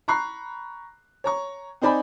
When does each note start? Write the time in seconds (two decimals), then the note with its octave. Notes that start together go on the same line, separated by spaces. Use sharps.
0.08 A#5 B5 C#6 F#6 C7
1.24 C#5 A#5 C#6
1.82 C4 D#4 C5 D5 G#5 B5